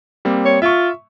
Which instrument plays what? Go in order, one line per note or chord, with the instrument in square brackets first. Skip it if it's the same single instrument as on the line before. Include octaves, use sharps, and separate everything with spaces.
[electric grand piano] G3 A#3 C4
[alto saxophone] C#5
[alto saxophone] F4 [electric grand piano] E5 C#6